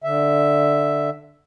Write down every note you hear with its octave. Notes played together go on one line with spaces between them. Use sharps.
D3 E5